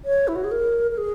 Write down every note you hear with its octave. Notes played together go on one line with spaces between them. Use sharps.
C#5
E4
F#4
G#4
A#4
A#4
G#4